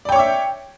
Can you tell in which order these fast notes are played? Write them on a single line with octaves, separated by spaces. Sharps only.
D5 G5 C#5 D6 E5